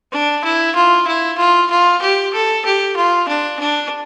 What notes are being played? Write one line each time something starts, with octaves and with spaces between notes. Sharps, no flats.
D4
E4
F4
E4
F4
F4
G4
A4
G4
F4
D4
D4